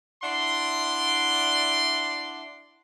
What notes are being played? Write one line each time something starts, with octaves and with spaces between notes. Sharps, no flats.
D4 E4 D5 F#5 C6